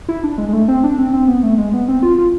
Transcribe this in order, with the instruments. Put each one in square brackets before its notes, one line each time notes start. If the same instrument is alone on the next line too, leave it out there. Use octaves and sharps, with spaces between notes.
[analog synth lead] E4
D4
G#3
G#3
A3
C4
D4
C4
C4
B3
A3
G#3
B3
C4
F4
F4